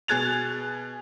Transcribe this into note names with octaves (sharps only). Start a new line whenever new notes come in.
B2 G#4 F#6 G#6 A6 F7